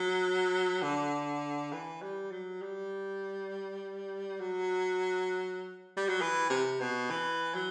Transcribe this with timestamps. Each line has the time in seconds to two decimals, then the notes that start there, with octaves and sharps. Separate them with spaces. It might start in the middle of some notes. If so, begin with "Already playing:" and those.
Already playing: F#3
0.82 D3
1.72 E3
2.02 G3
2.32 F#3
2.62 G3
4.40 F#3
5.97 G3
6.09 F#3
6.21 E3
6.50 C3
6.80 B2
7.10 E3
7.55 F#3